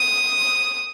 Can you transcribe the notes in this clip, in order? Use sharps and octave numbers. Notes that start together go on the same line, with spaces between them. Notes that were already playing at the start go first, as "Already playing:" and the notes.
Already playing: D#6